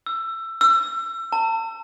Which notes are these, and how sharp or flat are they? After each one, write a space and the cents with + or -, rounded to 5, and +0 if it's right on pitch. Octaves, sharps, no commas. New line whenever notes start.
E6 +20
E6 +30
A5 +40